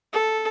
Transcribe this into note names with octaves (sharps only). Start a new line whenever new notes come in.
A4